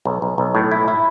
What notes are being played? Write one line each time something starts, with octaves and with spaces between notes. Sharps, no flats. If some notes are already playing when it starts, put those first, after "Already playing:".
B1
B1
B1
A2
E4
E4